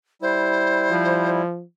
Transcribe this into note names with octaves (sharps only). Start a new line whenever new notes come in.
G3 E4 C5
F3